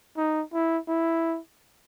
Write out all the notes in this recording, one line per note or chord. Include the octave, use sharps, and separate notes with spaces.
D#4
E4
E4